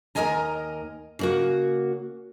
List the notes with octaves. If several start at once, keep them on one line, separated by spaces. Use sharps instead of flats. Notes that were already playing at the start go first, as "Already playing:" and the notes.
D#2 B2 A#4 D#5 G#5 A#5
C#3 A#3 F#4